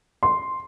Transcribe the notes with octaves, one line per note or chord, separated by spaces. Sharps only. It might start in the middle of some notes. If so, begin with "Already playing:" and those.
C6